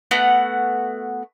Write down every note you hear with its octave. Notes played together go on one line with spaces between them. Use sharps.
A3 B3 F#4 F#5